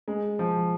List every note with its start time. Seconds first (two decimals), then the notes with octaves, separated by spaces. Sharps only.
0.08 G#3
0.39 F3